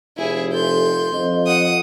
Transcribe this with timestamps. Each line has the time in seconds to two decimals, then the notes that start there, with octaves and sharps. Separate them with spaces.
0.17 F1 E4 G#4
0.54 A4 C6 G6
1.13 F2 D#5
1.47 F#5 D#6